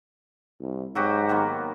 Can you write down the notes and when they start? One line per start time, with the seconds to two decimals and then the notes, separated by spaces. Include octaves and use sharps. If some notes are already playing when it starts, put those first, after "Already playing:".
0.60 C2
0.95 G#2 F#3 F#4 G4
1.29 D#3 A#3 B3